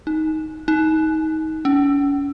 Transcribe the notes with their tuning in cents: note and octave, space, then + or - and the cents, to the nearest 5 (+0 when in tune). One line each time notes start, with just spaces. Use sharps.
D#4 +10
D#4 +25
C#4 +35